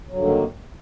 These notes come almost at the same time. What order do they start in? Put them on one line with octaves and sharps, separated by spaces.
F#3 G2 D3 D#3 A#3